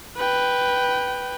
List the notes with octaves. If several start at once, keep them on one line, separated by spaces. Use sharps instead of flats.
B4 G5